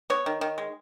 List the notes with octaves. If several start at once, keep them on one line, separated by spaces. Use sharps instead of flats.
B3 C#5
D#3
D#3
G#3